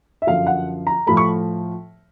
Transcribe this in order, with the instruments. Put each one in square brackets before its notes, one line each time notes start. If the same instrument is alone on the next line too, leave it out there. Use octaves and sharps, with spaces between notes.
[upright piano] E5
F#2 D3 F3 F5
F#5
A#5
A2 F3 A3 B5
C#6